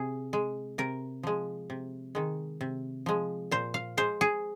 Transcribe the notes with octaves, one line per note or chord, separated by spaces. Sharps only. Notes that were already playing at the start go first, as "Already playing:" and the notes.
Already playing: C3 G#4
G#3
C3 A#4
F3 G#3
C3
D#3 G#3
C3
F3 G#3
A#2 C5
F5
G#3 C5
G#4